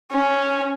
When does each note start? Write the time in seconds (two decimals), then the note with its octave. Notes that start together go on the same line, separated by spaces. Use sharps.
0.12 C#4